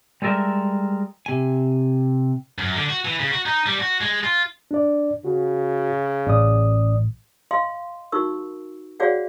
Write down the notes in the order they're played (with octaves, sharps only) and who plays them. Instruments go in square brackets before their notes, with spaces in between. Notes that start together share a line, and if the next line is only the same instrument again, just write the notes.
[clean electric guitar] G3 G#3 A4 A#4 E5
C3 G#5
[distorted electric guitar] F#2
D3
F#4
E3
C#3
F#4
D#4
G3
F#4
G#3
F4
[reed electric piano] D4 D5
[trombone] C#3 [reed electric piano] F#4
[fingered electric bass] A1 [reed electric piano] C#4 D5 D#6
[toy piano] D#5 F5 C6
D#4 F#4 A#4 C#6 E6
F#4 G#4 C#5 D5 F5 F#5